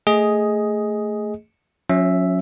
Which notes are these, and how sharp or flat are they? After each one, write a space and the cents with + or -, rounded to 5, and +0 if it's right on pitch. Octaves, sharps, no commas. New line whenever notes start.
A3 +15 G#4 +0 D#5 +10
F#3 -40 C#4 +0 E5 +0